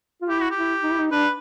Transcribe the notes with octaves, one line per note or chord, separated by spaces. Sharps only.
F4
E4 G4
F#4
G4
E4
D#4
E4
D#4
D4 B4